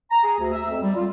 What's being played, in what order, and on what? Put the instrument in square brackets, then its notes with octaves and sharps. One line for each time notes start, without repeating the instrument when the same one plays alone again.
[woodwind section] A#5
G#4
D2
E5
F2
G3
F4